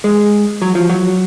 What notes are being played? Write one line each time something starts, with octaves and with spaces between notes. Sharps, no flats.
G#3
F#3
F3
F#3